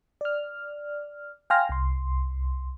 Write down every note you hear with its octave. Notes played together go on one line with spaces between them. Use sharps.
D5 F6
F5 G5 G#5 C6 F6 A#6
C2 C6